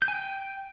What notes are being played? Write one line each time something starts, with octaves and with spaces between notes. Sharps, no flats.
G6
G#5
G5